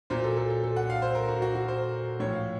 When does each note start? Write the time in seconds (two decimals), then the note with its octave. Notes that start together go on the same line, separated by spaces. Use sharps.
0.10 A#2 F#3 C5
0.24 A4
0.37 A4
0.50 A4
0.63 A4
0.76 F#5
0.90 F5
1.02 C5
1.15 A#4
1.28 F#4
1.42 F#4
1.55 F#4
1.68 C5
2.20 A2 F3 C#5
2.33 F5